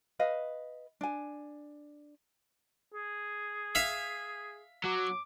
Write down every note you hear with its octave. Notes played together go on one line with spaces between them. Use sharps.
B4 D#5 F5
D4 G#5
G#4
E5 F5
F#3 D6